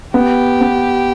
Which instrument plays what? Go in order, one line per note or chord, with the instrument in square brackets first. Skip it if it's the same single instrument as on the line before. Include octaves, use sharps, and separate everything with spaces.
[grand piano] B3 [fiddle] G4
[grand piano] B3